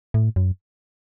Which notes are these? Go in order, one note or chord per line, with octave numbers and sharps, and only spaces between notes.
A2
F#2